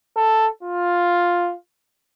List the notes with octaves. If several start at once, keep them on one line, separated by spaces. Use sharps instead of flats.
A4
F4